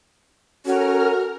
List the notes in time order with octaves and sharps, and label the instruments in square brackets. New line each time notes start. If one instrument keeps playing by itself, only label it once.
[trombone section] C#4 [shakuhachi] F#4 [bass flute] A4 [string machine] A#4 F6